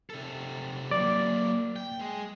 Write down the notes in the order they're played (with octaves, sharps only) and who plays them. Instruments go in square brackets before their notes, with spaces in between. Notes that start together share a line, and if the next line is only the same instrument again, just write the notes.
[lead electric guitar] C3 A4
[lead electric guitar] F#3 A#3 [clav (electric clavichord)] D5
[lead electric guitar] G5
G#3